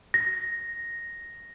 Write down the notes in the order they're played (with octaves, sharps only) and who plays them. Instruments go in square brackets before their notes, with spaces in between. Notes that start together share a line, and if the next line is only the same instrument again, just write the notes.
[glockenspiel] A#6